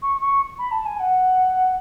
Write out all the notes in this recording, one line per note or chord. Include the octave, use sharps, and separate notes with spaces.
C#6
C#6
B5
A5
G#5
F#5